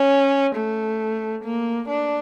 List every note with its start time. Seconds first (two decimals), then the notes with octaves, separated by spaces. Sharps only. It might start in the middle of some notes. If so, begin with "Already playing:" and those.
Already playing: C#4
0.56 A3
1.44 A#3
1.88 D4